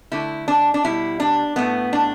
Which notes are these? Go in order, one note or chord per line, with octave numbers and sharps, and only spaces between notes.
D3 A3 E4
D4
D4
B2 G3 E4
D4
A2 A3 B3
D4